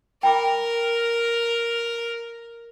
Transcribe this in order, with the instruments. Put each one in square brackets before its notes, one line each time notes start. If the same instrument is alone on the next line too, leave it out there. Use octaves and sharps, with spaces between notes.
[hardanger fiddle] A#4 [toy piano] G5 B5 D6